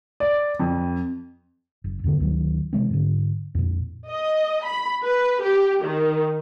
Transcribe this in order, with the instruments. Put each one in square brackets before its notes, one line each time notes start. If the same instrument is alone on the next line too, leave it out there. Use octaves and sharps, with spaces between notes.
[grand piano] D5
F2
[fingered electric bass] F#1
E2 G2 D3 B3
D2 D#3 F#3
C3 E3 G#3 C4
G#2 D3
F2 A#2
[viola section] D#5
B5
B4
G4
D#3